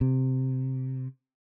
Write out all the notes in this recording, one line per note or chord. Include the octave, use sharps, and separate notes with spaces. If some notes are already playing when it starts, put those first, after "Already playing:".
C3